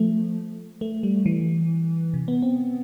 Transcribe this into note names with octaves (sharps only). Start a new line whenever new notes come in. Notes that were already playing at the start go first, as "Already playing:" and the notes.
Already playing: F3 A3
A3
G3
E3
C3
B3
C4